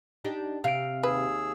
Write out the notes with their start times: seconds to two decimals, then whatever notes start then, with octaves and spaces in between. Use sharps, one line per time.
0.25 D4 D#4 G4
0.64 C3 F5 D7
1.03 D#2 G#4 B4 E6